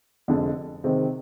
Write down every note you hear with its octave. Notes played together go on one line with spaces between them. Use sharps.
F1 F2 D3 G#3
C3 D#3 G#3 C4